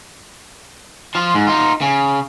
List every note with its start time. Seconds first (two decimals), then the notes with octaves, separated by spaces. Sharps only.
1.15 F3 F4
1.34 G#2
1.47 D#4 F4
1.81 C#3